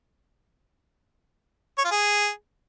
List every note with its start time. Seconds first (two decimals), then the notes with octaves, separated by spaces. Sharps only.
1.78 C#5
1.85 F4
1.91 G#4